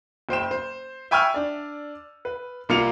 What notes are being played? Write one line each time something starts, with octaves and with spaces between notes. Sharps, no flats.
F#1 C5 G5 E7
C5
E5 G5 G#5 C#6 E6 F6
D4 D5
B4
C2 A#3 F4 C#7 F7